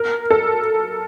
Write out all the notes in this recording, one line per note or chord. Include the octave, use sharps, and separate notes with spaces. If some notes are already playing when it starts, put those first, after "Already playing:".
Already playing: A#4
A4